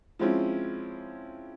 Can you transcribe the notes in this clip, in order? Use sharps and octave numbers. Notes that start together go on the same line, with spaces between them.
F3 G#3 C4 C#4 E4